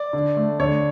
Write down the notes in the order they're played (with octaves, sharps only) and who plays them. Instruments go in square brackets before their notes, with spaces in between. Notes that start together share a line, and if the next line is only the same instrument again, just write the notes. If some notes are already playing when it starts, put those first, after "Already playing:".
Already playing: [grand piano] D5
D3
A3
D3 C#5